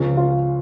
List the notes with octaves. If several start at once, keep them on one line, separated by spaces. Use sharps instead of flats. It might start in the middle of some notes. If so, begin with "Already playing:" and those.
Already playing: C#2 C#3 F3 C#4
F4